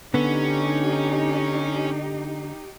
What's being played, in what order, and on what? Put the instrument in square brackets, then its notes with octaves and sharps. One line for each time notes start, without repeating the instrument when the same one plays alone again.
[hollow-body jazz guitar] D3 B3 [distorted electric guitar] C#4 [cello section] D#4 G4